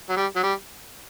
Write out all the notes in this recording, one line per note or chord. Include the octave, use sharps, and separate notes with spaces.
F#3
G3
F#3
G3